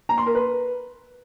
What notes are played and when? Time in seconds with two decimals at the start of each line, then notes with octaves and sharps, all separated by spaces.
0.09 A#5
0.18 C6
0.26 A#4
0.35 B4